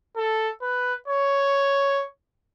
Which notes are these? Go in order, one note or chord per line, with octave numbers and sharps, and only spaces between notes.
A4
B4
C#5